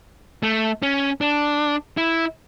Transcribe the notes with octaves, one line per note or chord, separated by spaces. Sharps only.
A3
C#4
D4
E4